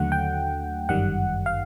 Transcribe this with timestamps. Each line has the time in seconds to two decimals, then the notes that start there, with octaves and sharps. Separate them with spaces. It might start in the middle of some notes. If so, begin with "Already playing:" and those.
Already playing: D#2 D3 F#3 A3 F#5
0.12 G5
0.89 G1 F#2 D#3 G3 F#5
1.46 F5